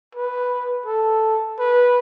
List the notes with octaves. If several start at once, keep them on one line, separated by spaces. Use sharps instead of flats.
B4
A4
B4